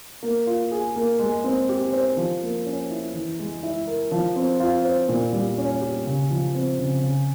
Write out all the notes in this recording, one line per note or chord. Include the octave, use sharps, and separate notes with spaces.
A#3
F4
G#4
A#3
G#3
C4
G4
C5
F3
A#3
C#4
E4
E3
G#3
E4
A#4
F3
C4
F4
C5
A#2
G3
C#4
G4
C#3
F3
C4
C#3
C#3